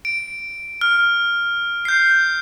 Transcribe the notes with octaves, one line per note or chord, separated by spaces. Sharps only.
D7
F6
G6 C7